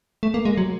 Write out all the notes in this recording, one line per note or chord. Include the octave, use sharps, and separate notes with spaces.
A3
A#3
G#3
F#3